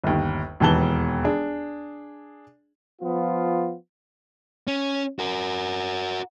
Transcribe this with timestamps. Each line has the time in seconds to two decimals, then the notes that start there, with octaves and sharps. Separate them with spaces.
0.04 G1 D#2
0.60 E1 D#2 E3 A5 G7
1.24 D4 G#4
3.02 F3 B3 F4
4.67 C#4
5.19 F#4 A#4